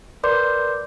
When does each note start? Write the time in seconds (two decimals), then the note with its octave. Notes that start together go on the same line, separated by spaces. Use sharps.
0.23 A#4 B4 D5 C6 D6 G6